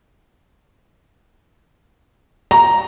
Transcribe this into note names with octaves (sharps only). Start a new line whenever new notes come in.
A#5